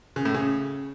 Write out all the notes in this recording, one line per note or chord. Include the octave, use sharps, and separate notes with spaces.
C#3
A2
C#3